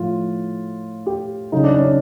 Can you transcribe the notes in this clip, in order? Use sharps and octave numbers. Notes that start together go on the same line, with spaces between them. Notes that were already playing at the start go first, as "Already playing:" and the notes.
Already playing: A2 F3 F4
G4
C#3 F#3 D#4
D4
C#4
D4